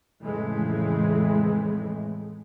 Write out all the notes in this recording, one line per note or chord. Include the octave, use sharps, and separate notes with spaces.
F2 A2 C#3 E3 G#3 A3